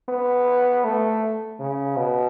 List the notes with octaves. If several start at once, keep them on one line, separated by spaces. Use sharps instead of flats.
B3
A3
C#3
B2